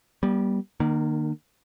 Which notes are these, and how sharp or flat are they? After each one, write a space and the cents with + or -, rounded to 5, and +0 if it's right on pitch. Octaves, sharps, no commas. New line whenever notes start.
G3 -10 B3 -45
D#3 -35 A#3 +0